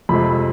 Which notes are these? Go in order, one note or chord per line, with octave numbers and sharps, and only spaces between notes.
F2 C3 F3 G#3 B5